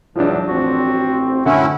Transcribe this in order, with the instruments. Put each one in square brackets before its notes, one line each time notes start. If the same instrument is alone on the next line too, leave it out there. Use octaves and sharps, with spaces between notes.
[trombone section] E2 G#2 B2 [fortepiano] F3 D4 [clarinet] F#3
[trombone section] A1 C4 [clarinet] F#4
[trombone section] F#2 A2 [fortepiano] D3 [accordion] C#4 E4 [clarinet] F#5